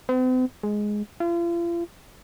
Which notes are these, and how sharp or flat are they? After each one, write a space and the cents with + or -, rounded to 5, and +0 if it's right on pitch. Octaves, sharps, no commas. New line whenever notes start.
C4 -45
G#3 +5
F4 -40